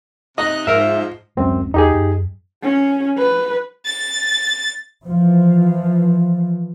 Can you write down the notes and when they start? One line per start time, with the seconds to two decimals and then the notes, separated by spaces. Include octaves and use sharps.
0.38 C3 D#4 D#5 F#6
0.67 G#2 F3 A#4 E5
0.80 F3
1.37 D1 F#2 G#3 C4 C#4
1.74 E2 D#4 G4 G#4
1.94 F#2
2.63 C#4
3.18 B4
3.85 A6
5.06 E3 F3